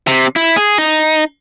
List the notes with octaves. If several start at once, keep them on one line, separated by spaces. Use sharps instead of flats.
C3
E4
G#4
D#4